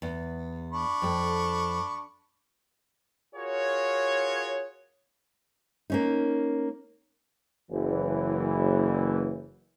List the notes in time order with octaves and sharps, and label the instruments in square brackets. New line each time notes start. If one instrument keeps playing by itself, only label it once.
[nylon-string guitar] E2
[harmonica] D4 B5 C#6
[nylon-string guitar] F2 A4
[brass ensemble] F4 F#4 G#4 A#4 C#5
[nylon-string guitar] A#3 C#4 D#4
[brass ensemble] F#1 E3